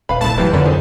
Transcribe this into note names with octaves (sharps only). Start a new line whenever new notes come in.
D#1 B4 F5 B5
C2 A3 A5
C3 D#3 E3 F#3 B4
F2 D3 A#3 C#4 B4
D#4 G#4 C5